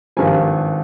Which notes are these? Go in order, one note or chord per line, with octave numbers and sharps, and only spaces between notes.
G#1 G2 F3 G#5